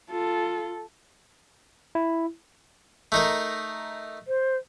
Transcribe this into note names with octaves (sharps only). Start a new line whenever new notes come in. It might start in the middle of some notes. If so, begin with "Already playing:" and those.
F4 A4
E4
A3 D#4 A#4
C5